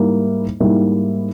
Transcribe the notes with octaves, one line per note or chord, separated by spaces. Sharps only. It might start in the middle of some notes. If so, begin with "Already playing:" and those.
Already playing: G#2 G3 A#3 E4
G#2 G3 A#3 E4